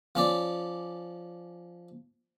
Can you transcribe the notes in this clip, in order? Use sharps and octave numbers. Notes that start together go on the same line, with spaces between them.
F3 C#4 D5